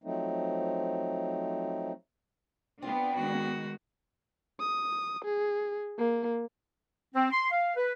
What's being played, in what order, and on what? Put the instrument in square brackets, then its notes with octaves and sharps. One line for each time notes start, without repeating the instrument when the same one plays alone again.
[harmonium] F3 F#3 A3 C4 D#4
[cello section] B3 D4 [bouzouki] C4 [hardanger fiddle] F4
[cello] D#3 G#3 [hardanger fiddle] F#4
[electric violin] D#6
G#4
A#3
[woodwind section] C4
C6
F5
B4